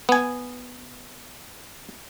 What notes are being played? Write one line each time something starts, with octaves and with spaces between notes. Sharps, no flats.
B3 G#5